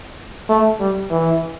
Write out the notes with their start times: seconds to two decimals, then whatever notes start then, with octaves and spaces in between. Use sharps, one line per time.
0.49 A3
0.80 G3
1.11 E3